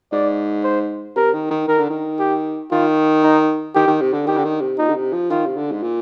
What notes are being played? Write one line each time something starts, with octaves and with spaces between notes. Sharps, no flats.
G#2 D5
C5
C3 A#4
D#3
D#3
D#3 A#4
D3
D#3
G4
D#3 F4
D#4
D#3 G4
D#3
C3
D3
D#3 G4
D3
D#3
C3
A#2 D#4
D3
C3
F3
D#3 F4
C3
D3
G#2
A#2